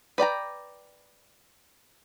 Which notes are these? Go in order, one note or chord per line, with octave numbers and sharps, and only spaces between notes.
B4 D5 G5 A#5